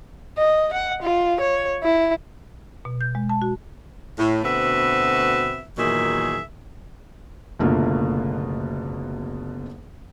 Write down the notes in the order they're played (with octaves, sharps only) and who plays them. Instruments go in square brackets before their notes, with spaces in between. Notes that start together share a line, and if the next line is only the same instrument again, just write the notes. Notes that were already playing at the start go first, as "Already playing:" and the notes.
[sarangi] D#5
F#5
F4
C#5
E4
[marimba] B2
G6
G#3
A5
F#4
[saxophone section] A2
D2 B2 C4 F#4 B4 E5
E2 A#2 D#3 F#3 G#4 E5
[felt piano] F#1 B2 D3 A3 A#3 F4